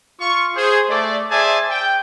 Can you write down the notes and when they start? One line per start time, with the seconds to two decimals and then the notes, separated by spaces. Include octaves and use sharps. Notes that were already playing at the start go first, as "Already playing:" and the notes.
0.20 F4 C#6
0.56 G#4 C5
0.90 A3 D5
1.30 G#4 C5 D5 E5 G#5 A5
1.70 G5